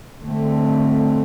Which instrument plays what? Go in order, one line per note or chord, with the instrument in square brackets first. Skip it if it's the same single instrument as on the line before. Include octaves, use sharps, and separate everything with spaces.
[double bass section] D3 A3 C4